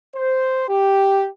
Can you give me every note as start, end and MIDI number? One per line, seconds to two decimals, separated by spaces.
0.16 0.67 72
0.68 1.29 67